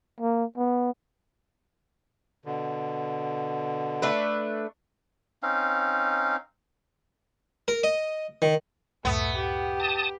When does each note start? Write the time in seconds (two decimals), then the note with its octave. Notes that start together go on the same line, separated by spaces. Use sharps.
0.21 A#3
0.58 B3
2.45 B2 D3
4.02 A3 D4 B4
5.43 C4 C#4 D#4 F5
7.68 A#4
7.83 D#5
8.42 D#3
9.05 C#2 F#2 A2 A3 B3
9.36 G4
9.80 A5 D#6